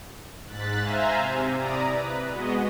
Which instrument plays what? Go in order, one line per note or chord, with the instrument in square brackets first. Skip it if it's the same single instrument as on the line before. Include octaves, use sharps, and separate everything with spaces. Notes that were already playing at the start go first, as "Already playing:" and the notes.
[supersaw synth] G#2 F#6 A6 B6
C5 E5 F5 G#5 A#5
C3
E4 D5 A#5 D#6
B4
G#3 B3 F#4 D#5